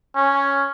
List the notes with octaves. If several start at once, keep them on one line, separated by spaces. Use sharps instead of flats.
C#4